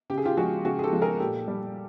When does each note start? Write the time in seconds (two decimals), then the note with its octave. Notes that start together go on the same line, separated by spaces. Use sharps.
0.10 C#3 G4
0.18 G#4
0.25 F4 G4
0.37 F3 G#3 F#4 G#4
0.65 C#3 F#4 G#4
0.79 G#4
0.84 G4 A4
0.92 F3 G#3
1.02 G#4 A#4
1.20 A#2 G4 A4
1.48 G3